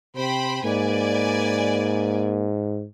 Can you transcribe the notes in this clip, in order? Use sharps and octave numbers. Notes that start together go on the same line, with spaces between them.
C3 C5 G5 B5
G#2 A#3 B4 D5 G#5